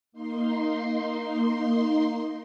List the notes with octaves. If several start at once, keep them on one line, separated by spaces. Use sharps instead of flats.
A#3 D#4 C6